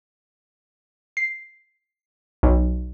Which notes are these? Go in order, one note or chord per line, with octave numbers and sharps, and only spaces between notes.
C7
B1